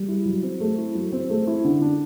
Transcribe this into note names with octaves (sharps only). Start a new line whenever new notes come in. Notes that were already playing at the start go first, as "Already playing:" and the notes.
Already playing: G3
E4
F#3
C4
A3
E4
F#3
C4
A3
E4
D3
D4